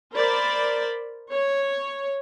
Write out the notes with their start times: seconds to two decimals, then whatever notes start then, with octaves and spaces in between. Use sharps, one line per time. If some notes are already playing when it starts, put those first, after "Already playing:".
0.14 A#4 C5 D5 B5
1.30 C#5